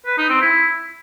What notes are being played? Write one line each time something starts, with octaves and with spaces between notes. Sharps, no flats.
B4
D#4
C4
E4